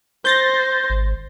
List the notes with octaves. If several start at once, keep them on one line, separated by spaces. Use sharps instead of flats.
C5 G6 A6 A#6
G#1